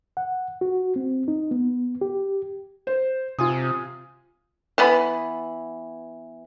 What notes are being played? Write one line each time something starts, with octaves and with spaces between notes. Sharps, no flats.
F#5
F#4
C4
D#4
B3
G4
C5
C3 F4 G#5 D#6
E3 B3 B5